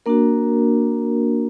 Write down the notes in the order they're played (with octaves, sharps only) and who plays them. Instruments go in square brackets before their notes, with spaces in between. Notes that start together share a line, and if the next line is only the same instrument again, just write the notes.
[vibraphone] A#3 D4 F#4 A#4